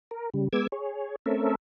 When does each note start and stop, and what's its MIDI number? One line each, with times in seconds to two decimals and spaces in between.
0.11 0.30 70
0.34 0.48 49
0.34 0.48 55
0.53 0.67 56
0.53 0.67 59
0.53 0.67 86
0.53 0.67 88
0.53 0.67 92
0.72 1.16 68
0.72 1.16 73
1.26 1.55 57
1.26 1.55 60
1.26 1.55 61
1.26 1.55 69
1.26 1.55 70
1.26 1.55 76